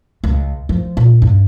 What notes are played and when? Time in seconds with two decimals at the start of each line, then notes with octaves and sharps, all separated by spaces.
0.24 C#2
0.69 F3
0.97 A#2
1.22 G2